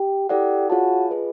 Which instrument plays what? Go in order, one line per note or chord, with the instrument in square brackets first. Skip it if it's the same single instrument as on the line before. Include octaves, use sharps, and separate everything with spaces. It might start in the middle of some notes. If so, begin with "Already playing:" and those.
Already playing: [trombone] G4
[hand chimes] E4 A4 D5 F#5 [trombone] G4
[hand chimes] F4 G#4 C#5 F5 A5 [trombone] F#4
[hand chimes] F4 G#4 B4 D#5